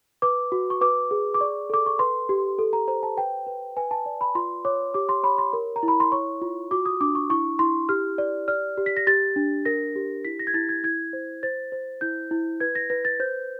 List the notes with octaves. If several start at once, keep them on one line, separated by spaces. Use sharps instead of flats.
B4 D6
F#4
C#6
B4 D6
G#4
D6
D5 C#6
A4 D6
C#6
B4 C6
G4
A4
A#5
C5 A#5
A5
B4 G5
B4
B4 G#5
A5
D5
B5
F4 C6
C#5 D6
G4 D6
C6
C#5 B5
C6
A#4
A#5
E4
B5
C6
C#5 C#6
F4
F#4 D6
D#6
D4 D6
C#6
E4 C#6
E4 C6
G4 F6
D5
D5 F6
G4
B6
A#6
G4 A6
D4
A#4 A#6
G4
E4 B6
A#6
G#6
E4 A6
G#6
E4 G#6
C5
C5 A6
C5
E4 G6
E4
B4 G#6
A#6
B4 A#6
A6
C5 G6